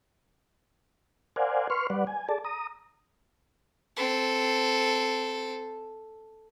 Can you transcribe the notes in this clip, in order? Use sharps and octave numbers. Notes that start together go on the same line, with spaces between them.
A#4 C5 D5 F5 F#5 G#5
B4 C6 C#6 F6
G3 B4 D5 F#5
G#5
G#4 A4 D5 A5
A#5 D#6
C4 A4